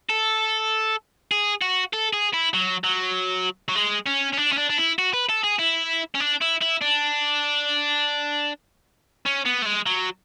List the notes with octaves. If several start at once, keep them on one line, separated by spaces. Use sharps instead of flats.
A4
G#4
F#4
A4
G#4
E4
F#3
F#3
F#3
G#3
C#4
C#4
D4
C#4
D4
D4
E4
F#4
B4
A4
G#4
E4
C#4
D4
E4
E4
D4
C#4
B3
A3
G#3
F#3